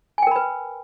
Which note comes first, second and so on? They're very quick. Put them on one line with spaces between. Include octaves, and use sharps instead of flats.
G#5 G5 A#4 B5 B4